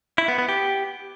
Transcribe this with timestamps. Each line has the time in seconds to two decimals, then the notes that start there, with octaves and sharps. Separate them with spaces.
0.18 E4
0.28 B3
0.38 B3
0.49 G4